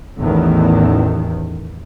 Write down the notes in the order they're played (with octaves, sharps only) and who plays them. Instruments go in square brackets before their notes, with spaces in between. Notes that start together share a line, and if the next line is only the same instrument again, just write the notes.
[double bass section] A1 E2 A2 D#3